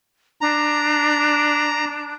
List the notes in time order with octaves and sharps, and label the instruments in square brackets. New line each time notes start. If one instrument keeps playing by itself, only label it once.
[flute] D4 [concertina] A#5